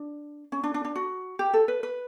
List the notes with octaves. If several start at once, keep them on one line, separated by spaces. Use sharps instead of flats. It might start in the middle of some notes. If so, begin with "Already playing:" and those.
Already playing: D4
C#4
D4
D4
D4
F#4
G4
A4
B4
B4